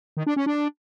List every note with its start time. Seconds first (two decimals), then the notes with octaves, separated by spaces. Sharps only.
0.17 D#3
0.27 D4
0.36 C#4
0.46 D4